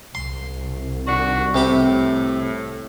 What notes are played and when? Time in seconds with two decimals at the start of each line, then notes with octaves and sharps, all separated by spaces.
0.15 C2 C6
1.07 D#3 D4 F#4
1.54 A2 C3 G4 B5